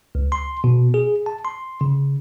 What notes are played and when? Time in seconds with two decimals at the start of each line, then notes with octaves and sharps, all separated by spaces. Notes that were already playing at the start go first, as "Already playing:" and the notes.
0.15 C#2
0.32 C6
0.64 B2
0.94 G#4
1.26 A5
1.45 C6
1.81 C#3